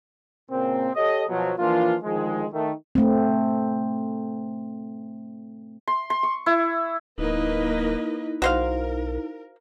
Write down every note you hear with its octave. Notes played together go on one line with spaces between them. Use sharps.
A#2 C#3 A#3 C4
G4 A4 C#5 D#5
B2 F3 F#3
E3 F3 A#3 D4 F4
D2 D#3 F3 G#3
D#3 A3
A3 C4
C6
C6
C#6
E4
D1 A#3 D#4 E4 B4 D#5
B1 F#4 A#4 C5 F5